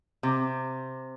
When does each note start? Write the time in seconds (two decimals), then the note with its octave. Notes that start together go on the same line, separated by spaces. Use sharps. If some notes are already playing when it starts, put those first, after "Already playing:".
0.23 C3